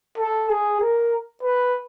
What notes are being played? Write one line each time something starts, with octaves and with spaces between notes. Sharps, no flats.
A4
G#4
A#4
B4